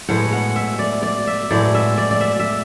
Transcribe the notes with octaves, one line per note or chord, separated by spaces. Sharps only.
A2 G#3 B3 F#5
F#5
E5
D5
D5
E5
A2 G#3 B3 D5
E5
D5
D5
E5
E5